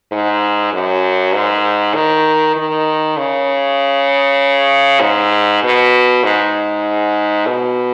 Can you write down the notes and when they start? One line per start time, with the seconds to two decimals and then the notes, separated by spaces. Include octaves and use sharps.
0.12 G#2
0.73 F#2
1.35 G#2
1.95 D#3
2.56 D#3
3.17 C#3
5.01 G#2
5.63 B2
6.24 G#2
7.47 B2